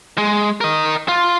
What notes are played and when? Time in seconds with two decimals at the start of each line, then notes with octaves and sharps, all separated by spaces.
0.18 G#3
0.61 A#4 D#5
1.08 F4